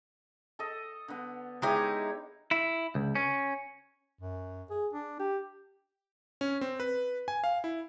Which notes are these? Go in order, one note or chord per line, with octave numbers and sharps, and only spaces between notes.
A4 D#5
D3 B3
G#3 D#4 E4 G4 C#5
E4
C#2
C#4
F#2
G#4
D4
G4
C#4
C4
B4
G#5
F5
E4